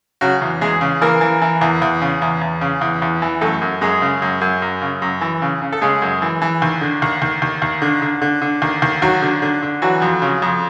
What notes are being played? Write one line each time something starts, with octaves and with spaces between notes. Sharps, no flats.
C#3 F#3 F#4
E2
E2 G#3 G#4
C#3
E3 A#3 A#4
E3
E3
E2
E2
C#3
E2
E2
C#3
E2
E2
E3
F#2 A3 A4
F#2
F#2 G#3 G#4
C#3
F#2
F#2
F#2
C#3
F#2
E3
C#3
C#3
A4
C#3 G#3 G#4
F#2
E3
E3
D#2
D3
D#2
D#2
D#2
D#2
D3
D3
D3
D3
D#2
D#2
D#2 F#3 F#4
D3
D3
D3
E3 F#3 F#4
F2
C#3
F2